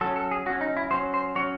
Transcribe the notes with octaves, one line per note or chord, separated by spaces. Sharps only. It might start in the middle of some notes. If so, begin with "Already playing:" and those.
F#3 C#4 A4
A4
G#4
F#3 C#4 F#4
D#4
E4
F#3 C#4 C5
C5
F#3 C#4 C#5